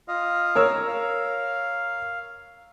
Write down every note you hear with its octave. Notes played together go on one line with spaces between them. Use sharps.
F4 D#5 F5
A#4 C#5 E6
F5